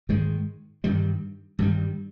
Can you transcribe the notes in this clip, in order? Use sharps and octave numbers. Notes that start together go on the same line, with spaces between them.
G#2 D#3 G#3
G2 D#3 G3
G2 D#3 G3